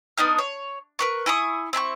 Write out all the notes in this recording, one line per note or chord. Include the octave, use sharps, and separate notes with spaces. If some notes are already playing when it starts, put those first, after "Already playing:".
B3 D4 D#4 F6
C#5
A#4 B4 C#6
E4 G#5 C#6 D#6
C4 E4 G#5 C#6